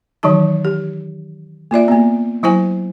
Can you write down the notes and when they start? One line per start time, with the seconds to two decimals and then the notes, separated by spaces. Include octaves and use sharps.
0.23 D#3 E3 F#3 D#4 A5
0.65 G4
1.71 A#3 F4 D5 E5
1.88 A#3 B3
2.43 F#3 E4 C5 G#5